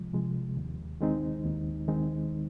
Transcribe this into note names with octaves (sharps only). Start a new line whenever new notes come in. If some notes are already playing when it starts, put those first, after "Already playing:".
Already playing: C2 C3 F3 G#3
C3 F3 G#3
D#2
D#3 G#3 C4 D#4
D#2
D#3 G#3 C4 D#4